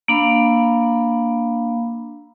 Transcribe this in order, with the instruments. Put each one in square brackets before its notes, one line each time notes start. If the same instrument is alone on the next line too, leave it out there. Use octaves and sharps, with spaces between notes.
[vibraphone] A#3 D4 F5 B5